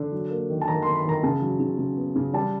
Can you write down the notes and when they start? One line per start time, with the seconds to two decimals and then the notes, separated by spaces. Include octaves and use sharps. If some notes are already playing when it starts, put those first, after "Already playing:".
Already playing: D3
0.12 F#3
0.30 A#3
0.50 D#3
0.61 A5
0.68 D#3 A#5
0.82 D#3 C6
0.95 B5
1.05 D#3 A#5
1.23 C#3 A5
1.42 F#3
1.60 C#3
1.78 C#3
1.97 B3
2.16 C#3
2.34 G3 A5